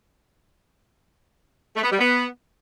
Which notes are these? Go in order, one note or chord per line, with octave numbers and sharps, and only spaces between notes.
A3
B3
G3
B3